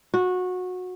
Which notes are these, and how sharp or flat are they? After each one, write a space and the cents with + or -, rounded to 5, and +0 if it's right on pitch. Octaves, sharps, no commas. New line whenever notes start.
F#4 -20